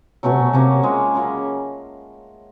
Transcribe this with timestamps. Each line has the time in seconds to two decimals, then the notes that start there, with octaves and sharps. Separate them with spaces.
0.23 B2 F#3 A3 C#4 F#4
0.31 C3
0.40 B2
0.53 C3 F#3 A#3 C#4
0.83 G#3 C#4 F4
1.14 C#3 F#3 A#3 C#4